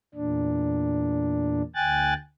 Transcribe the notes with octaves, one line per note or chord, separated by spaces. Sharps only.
E2 A#2 D4
D2 G5 G#5 F#6 A6